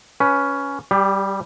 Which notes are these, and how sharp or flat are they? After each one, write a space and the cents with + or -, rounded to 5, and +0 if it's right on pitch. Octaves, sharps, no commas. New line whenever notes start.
C#4 +10 B4 -5
G3 -10 G4 +30